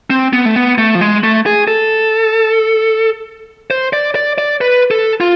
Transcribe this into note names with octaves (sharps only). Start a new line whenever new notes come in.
C4
B3
A3
B3
A3
F3
G#3
A3
G#4
A4
C5
D5
D5
D5
B4
A4
F4